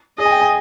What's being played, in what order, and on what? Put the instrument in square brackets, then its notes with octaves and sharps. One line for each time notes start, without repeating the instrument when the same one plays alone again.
[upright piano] G#4 [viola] D#5
[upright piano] G#5
G5
G#5